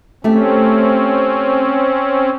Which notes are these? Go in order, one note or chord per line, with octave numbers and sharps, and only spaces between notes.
A3 C4 C#4 G4